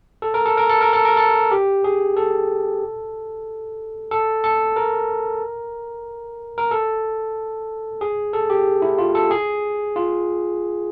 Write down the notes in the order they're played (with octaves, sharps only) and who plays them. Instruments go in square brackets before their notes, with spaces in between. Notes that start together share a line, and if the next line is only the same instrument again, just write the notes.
[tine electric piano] A4
A#4
A4
A#4
A4
A#4
A4
A#4
A4
G4
G#4
A4
A4
A4
A#4
A#4
A4
G#4
A4
G4
E4
F4
A4
G#4
F4